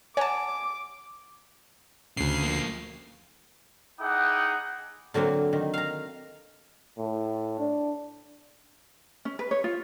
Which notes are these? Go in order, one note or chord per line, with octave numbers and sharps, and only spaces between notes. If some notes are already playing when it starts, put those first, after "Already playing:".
C#5 F#5 G#5 A5 D6
D2 C#3 C7
F3 A#3
D#4 E4 G#4 F#5 G5 D6
D3 F#3 A#3 C4
D#3
F5 A#5
A2
D4
C#4
B4
C#5
F4